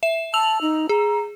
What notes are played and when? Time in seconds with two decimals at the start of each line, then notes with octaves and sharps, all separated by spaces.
0.03 E5 E7
0.34 A5 E6 F7 F#7
0.62 D#4
0.89 G#4 A#5